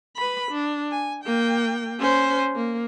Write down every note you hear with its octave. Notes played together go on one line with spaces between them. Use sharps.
B4 B5
D4
G#5
A#3 G5
C#4 C5
A#3